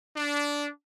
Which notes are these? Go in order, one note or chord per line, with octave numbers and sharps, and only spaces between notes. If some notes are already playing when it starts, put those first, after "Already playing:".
D4